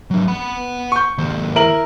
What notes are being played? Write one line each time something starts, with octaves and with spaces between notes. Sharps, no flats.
F#3 D4
F#5 B5
C#6 G6
D#2 C5
E4 A#4 F#7